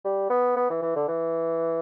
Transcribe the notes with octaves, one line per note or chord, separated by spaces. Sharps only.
G3
B3
B3
E3
E3
D3
E3